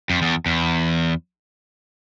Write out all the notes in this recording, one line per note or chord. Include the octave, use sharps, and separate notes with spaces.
F2
E2
E2